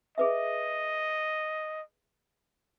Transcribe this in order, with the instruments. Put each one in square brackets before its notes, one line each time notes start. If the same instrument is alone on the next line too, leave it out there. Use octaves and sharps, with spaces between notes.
[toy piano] G#4 B4 E5 [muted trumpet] D#5